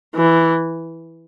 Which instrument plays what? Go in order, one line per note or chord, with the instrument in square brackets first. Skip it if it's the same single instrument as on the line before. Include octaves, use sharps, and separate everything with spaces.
[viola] E3